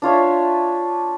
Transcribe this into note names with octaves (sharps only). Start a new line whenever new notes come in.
D4 F4 C#5 E5